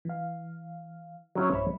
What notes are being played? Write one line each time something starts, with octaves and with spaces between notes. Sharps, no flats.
E3 F5
F#3 C#4 E4
B1 G2 C5 C#5 E5 B5